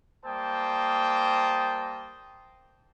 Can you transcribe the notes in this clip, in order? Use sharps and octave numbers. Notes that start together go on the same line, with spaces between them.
G3 A#3 C5 G5 A5 D#6